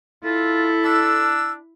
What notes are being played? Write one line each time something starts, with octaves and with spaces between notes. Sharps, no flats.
E4 F4 A4
D4 E6